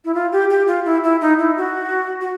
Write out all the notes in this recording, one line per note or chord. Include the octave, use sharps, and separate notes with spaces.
E4
F4
G4
G4
F4
E4
E4
D#4
E4
F#4
F#4